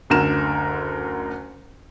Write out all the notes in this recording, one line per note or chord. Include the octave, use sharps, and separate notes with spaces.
F#1 D2 D3 A#4 E7